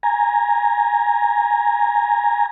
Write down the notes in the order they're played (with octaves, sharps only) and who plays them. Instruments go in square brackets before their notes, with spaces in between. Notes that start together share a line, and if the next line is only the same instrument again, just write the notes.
[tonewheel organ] G#5 A#5